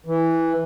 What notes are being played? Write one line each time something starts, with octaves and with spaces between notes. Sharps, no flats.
E3